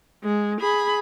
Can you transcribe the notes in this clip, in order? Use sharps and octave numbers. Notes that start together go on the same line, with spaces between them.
G#3
G#4 B5